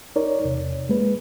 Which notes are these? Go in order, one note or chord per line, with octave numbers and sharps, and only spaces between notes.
D#4 A#4 C#5 D5
E2 C3
G#3 A#3 B4